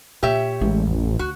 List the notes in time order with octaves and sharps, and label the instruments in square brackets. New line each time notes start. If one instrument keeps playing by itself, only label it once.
[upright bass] A#2 [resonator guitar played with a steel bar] G4 C#5 E5
[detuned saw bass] A1 [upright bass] G#3
[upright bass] F2
[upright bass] D2 [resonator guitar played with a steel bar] F#4